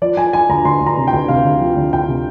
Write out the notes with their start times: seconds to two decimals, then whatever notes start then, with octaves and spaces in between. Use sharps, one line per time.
0.02 F3 D5
0.17 F3 G#5
0.33 F3 G#5
0.49 D2 A#5
0.65 D2 C6
0.81 D2
0.86 A#5
0.97 C3
1.07 G5
1.13 D2
1.28 C3 F5
1.45 D2
1.61 F3
1.77 D2
1.93 D2 G5
2.08 C3